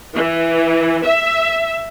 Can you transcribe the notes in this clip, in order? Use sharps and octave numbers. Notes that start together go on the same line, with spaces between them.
E3
E5